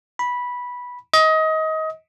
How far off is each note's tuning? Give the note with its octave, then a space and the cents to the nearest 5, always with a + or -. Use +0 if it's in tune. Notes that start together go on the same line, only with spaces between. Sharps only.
B5 -10
D#5 +25